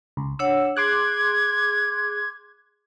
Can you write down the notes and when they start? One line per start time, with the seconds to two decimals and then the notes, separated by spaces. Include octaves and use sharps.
0.17 C#2
0.39 D4 C#5 F#5 E6
0.77 G#4 C6 D6 F#6 G#6